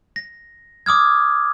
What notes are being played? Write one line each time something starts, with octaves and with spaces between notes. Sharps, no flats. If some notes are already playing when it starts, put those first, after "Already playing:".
A#6
D6 D#6 F6 G#6